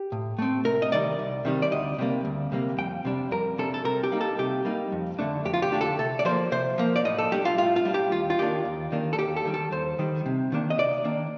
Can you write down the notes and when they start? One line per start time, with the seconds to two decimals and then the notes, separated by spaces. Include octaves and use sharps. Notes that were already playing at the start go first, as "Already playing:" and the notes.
Already playing: G4
0.12 A2
0.39 A3 C4
0.65 C2 A#4
0.82 D#5
0.92 C3 D#3 G3 D5
1.19 C2
1.45 C3 D#3 G3
1.62 D5
1.72 D2 D#5
1.98 C3 G3 A#3
2.25 D2
2.52 C3 G3 A#3
2.78 F2 G5
3.05 C3 G3 D4
3.31 F2 A#4
3.58 C3 G3 D4 A4
3.74 A4
3.85 C3 A#4
4.03 G4
4.12 G3 A#3 D#4
4.21 A4
4.39 C3 G4
4.65 G3 A#3 D#4
4.92 F2
5.19 D3 A3 D4
5.45 F2 G4
5.54 F4
5.62 G4
5.72 D3 A3 D4
5.81 A4
5.99 C3 A4
6.19 D5
6.25 F3 A#3 C5
6.52 C3 C5
6.78 F3 A#3
6.96 D5
7.05 A2 D#5
7.18 A4
7.32 G3 D4 G4
7.45 F4
7.58 A2 F4
7.76 F4
7.85 G3 D4
7.94 G4
8.11 D#2 F4
8.30 F4
8.39 D#3 A#3 D4 G4
8.65 D#2
8.92 D#3 A#3 D4
9.13 A4
9.18 D#2 G4
9.36 A4
9.45 D#3 G3
9.54 A4
9.72 D#2 C5
9.99 D#3 G3
10.26 C3
10.52 D#3 A#3 D4
10.70 D#5
10.78 C3 D5
11.04 D#3 A#3 D4